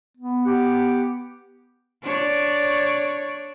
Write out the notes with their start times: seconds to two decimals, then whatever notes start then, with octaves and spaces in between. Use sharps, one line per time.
0.17 B3
0.44 G4 F#5
2.03 D4 C#5 D5